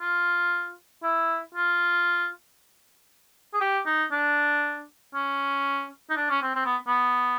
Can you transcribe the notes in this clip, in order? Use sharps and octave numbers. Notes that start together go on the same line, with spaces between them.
F4
E4
F4
G#4
G4
D#4
D4
C#4
D#4
D4
C#4
C4
C4
B3
B3